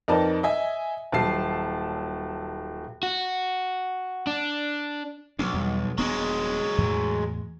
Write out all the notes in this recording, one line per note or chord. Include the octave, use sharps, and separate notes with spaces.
F2 D#4 A#4 B4 D5 A5
D#5 E5 G#5
D#1 F#3 A5 C7
F#4
D4
B1 F#3 B3 D4
E2 G3
D#1 F#3 G#3 B3 D4
E2 A2 E3